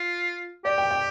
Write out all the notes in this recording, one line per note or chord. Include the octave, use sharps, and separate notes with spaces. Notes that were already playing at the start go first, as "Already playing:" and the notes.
Already playing: F4
G4 D5
G5
G5